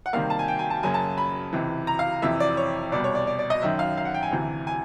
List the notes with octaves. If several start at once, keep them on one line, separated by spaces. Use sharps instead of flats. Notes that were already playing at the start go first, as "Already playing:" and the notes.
F#5
C3 D#3 G3 A#3 F5
A5
G#5
G5
G#5
A5
F#2 C#3 F#3 A#3 G#5
A5
B5
C#2 C3 E3
A#5
F5
F2 C3 E3 E5
D5
C#5
C2 B2 G3 D5
C#5
D5
D5
D5
D#5
F#2 D#3 F#3 E5
F5
F5
F#5
G5
G#5
D2 C3 E3
G#5